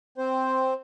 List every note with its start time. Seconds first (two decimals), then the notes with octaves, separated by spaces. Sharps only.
0.18 C4 C5